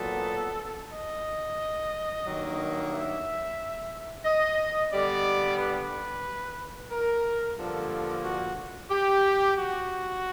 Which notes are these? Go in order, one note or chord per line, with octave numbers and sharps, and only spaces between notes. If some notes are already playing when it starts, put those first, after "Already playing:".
Already playing: A#2 F#3 B3 A4
D#5
G2 D#3 F#3 A#3
E5
D#5
G2 D3 G3 B3 D5
B4
A#4
G2 D3 F3 A#3 A4
F#4
G4
F#4